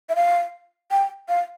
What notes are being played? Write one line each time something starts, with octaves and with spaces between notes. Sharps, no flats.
E5
F5
G5
F5